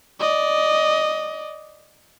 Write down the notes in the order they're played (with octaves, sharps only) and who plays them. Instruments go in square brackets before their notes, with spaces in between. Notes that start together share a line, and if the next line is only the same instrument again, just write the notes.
[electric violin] D5 D#5